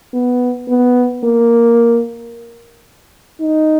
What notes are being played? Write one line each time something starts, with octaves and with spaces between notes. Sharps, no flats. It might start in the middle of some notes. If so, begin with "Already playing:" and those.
B3
B3
A#3
D#4